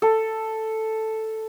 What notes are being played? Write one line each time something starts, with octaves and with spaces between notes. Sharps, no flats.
A4